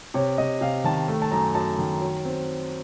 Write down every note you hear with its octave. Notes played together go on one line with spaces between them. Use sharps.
C3 C#5
C3 D#5
C3 F5
D#3 A5
A3
A5
F#2 A#5
F#2 A5
D#3
F#3
C4